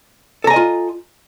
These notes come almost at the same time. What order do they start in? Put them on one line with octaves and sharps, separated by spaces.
A4 A#5 G#5 D#5 F4